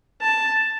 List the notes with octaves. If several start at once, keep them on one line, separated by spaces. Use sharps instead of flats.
A5